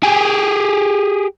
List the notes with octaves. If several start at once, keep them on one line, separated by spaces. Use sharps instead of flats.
G4 G#4